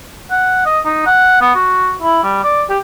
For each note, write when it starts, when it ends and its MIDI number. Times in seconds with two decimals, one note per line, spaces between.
0.31 0.63 78
0.66 0.80 75
0.85 1.05 63
1.06 1.37 78
1.41 1.52 59
1.55 1.94 66
2.02 2.23 64
2.23 2.43 55
2.44 2.64 74
2.70 2.78 67